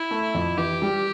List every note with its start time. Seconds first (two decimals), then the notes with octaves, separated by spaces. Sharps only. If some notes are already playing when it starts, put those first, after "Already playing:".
Already playing: E4
0.11 A3
0.34 F2
0.57 E3 G4
0.82 G3